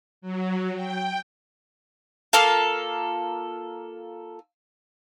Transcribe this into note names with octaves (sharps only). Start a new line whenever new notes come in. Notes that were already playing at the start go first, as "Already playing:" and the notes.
F#3
G5
A#3 F4 A4 F5